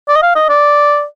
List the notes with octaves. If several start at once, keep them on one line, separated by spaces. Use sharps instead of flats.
D5
D#5
F5
D#5
D5